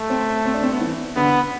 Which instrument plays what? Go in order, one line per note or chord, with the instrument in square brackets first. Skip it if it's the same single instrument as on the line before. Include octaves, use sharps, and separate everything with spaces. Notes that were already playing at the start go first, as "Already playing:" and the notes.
Already playing: [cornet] A3
[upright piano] C4
C4
D4
C4
B3
E3
[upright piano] D3 [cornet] B3